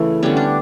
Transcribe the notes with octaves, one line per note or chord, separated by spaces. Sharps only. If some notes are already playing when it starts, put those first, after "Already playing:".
Already playing: C#3 E3 A3
D3 G3 B3 C#4
D4